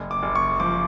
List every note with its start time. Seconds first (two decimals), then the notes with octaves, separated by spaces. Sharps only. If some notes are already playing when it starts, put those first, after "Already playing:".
Already playing: F#1
0.11 D6
0.22 F#1
0.35 C#6
0.60 F3 D6